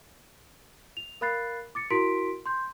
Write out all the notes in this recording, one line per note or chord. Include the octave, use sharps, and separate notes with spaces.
F7
A#4 F5 B5 F#6 A6 C7
D6 A6 C#7
E4 F#4 A#4 C6 B6 D7
C6 G6